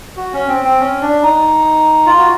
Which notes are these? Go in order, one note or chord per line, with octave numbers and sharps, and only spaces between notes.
F#4
C#4
C4
C4
C#4
D4
D#4
F4
F#4